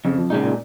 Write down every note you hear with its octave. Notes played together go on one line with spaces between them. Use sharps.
F2 C#3
F3
A#2 C#3 G#3 D#4
A#2